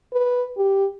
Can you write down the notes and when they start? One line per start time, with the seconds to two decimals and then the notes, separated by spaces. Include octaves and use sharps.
0.13 B4
0.57 G4